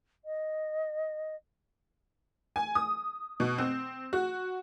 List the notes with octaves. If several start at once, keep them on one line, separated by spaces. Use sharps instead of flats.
D#5
G#5
D#6
B2
C4
F#4